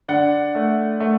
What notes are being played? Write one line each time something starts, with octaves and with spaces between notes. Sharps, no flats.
D3 D5 F#5
A3
A3